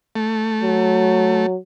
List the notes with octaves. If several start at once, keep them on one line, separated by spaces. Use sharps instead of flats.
A3
F#3